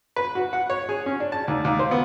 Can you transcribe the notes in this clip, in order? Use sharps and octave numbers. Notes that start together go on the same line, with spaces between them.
B4
F#4
F#5
C#5
G#4
C#4
D4
A5
D#2
D#2
C5
B3